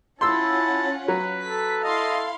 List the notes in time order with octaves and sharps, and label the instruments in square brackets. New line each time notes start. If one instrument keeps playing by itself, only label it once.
[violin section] C#4 F4 F#5 [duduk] E4 [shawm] A5 [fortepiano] C6 E6
[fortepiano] F#3 [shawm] B4
[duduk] A4 [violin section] B6
[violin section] E4 F5 C6 [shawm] D#5